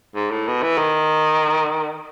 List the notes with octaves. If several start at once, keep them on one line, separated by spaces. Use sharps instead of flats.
G#2
A2
B2
E3
D#3